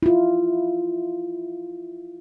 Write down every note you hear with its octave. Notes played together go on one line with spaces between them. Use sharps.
E4 F4